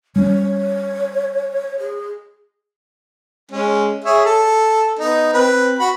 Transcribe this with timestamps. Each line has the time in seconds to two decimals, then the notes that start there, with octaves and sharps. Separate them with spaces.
0.16 G3 C#4 C#5
1.79 G#4
3.51 G#3 C#4
4.04 G#4 C#5 E5
4.25 A4
4.99 B3 D#4
5.33 C4 B4
5.79 F#4 B5